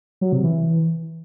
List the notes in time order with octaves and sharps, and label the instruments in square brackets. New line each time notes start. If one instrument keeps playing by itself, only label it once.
[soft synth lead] F#3
C3
E3